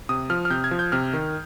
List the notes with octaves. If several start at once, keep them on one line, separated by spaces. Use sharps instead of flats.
C3 D#6
F3 F6
F6
C3 G6
G#6
F3
G6
C3 F6
D#3